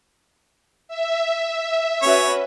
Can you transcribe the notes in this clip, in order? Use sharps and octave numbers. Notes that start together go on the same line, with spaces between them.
E5
C#4 F#4 B4 C#5